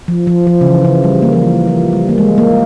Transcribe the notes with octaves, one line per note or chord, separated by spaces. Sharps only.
F3
F3
F3
C#3
E3
C#3
G3
A#3
F3
E3
F3
G3
A#3
G#3
A#3